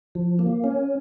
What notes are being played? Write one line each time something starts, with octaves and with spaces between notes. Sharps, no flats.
F3
A#3
C#4